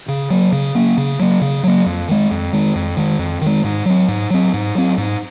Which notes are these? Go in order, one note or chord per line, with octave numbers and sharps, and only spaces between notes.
C#3
F#3 A#3
C#3
F#3 A#3
C#3
F#3 A#3
C#3
F#3 A#3
F2
D#3 G#3
F2
D#3 G#3
F2
D#3 G#3
F2
D#3 G#3
G#2
F#3 C4
G#2
F#3 C4
G#2
F#3 C4
G#2